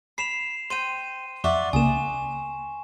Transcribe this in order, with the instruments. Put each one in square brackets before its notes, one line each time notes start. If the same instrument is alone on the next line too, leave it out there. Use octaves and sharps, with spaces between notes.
[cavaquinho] B5 [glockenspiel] C7 E7 F7
[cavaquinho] C5 G5 [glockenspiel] C6 D#7
[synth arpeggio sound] F2 [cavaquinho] D5 E5 F#5 [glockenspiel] C#6
[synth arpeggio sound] C#2 C#3 A#3 [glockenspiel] G#5 E7 [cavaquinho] D#6